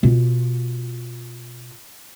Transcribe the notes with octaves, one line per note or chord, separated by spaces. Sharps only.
B2 F4